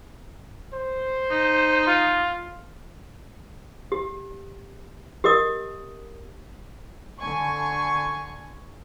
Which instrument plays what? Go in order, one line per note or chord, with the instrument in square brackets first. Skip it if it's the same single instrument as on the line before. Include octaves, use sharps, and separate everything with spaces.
[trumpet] C5
[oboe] D#4
[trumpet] F4
[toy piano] G4
G4 A#4 D#5 D#6
[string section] D3 G#5 C#6